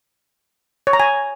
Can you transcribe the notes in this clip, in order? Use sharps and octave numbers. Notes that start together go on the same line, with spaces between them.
C#5
A#5
G#5